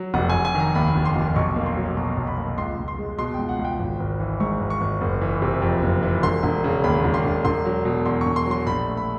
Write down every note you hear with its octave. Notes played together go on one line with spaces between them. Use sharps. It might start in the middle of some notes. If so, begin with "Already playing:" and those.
Already playing: F#3
F1 F#5
F1 G#5
G#5
D#3
A#5
D#2 B5
F1
C6
F1
B1 C#6
A#3
C6
F#3
B2 A#5
B1
B5
A#3
C#2 C6
C#2
C6
G#3
B2 C6
C#2 G5
F#5
C#2
G5
G#1
G#1
E3
G#2 C#6
G#1
C#6
G#1
F#1
E3
C3
F2
F#1
E3
E1 C6
E1
C#3
D#2 B5
E1
C6
E1
E1 C6
F#3
B2
E2 C6
E1 C#6
C6
F#3 C6
A#1 B5
A3
B5